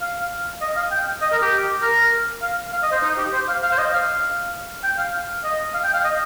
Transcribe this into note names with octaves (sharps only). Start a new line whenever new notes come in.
F5
D#5
F5
G5
D#5
A#4
G4
A#4
F5
F5
D#5
C5
D#4
G4
C5
F5
F5
C5
D#5
F5
G5
F5
D#5
F5
G5
F5
D#5